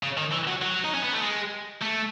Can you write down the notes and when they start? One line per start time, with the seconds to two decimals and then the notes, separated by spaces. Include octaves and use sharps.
0.03 C#3
0.18 D#3
0.32 E3
0.48 F#3
0.62 F#3
0.84 D#4
0.94 C#4
1.03 B3
1.13 A3
1.22 G#3
1.82 A3